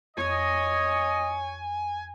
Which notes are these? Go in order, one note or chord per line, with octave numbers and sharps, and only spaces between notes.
F2 C#5 D#5 G#5 G#6